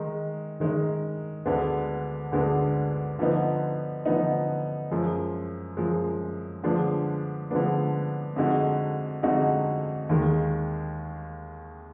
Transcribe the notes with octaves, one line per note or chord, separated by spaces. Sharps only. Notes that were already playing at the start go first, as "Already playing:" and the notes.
Already playing: D#3 G#3 D#4
D#3 G#3 D#4
D2 D3 G#3 B3 D4
D2 D3 G#3 B3 D4
D3 F3 B3 D#4
D3 F3 B3 D#4
F#2 F3 G#3
F#2 F3 G#3
D3 F3 G#3 B3 D4
D3 F3 G#3 B3 D4
F2 D3 G#3 D#4 F#4
F2 D3 G#3 D#4 F#4
D#2 D#3 G#3